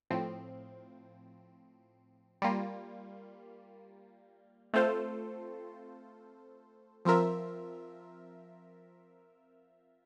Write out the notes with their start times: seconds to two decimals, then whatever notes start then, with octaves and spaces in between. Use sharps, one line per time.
0.10 A2 F3 C4
2.42 G3 A#3 F4
4.74 A3 C4 F4 A4 C5
7.05 F3 C4 F4 A#4 E5